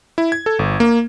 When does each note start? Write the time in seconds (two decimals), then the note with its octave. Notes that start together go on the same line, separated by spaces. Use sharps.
0.18 E4
0.32 G#6
0.46 A4
0.59 G1
0.80 A#3